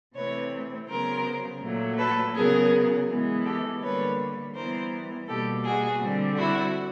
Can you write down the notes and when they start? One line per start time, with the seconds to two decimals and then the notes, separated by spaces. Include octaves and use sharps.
0.14 C3 E3 A3 C4 B4 C#5
0.88 C#3 F#3 B3 A#4 C5
1.61 A#2 F#3 A3
1.98 A4 B4
2.34 C#3 F#3 B3 G#4 A#4
3.08 E3 G#3 B3
3.45 G4 A4
3.82 D3 G3 A#3 B4 C#5
4.55 E3 G3 B3 A#4 C5
5.27 B2 G3 A#3 G4 A4
5.64 F#4 G#4
6.01 D3 G3 C4
6.37 E4 F#4